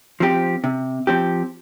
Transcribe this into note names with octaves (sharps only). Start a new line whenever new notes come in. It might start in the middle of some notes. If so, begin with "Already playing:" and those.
F3 C4 G4
C3
F3 C4 G4